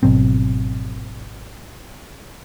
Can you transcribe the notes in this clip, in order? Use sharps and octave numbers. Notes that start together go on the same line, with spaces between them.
G#1 B2 F#3 C4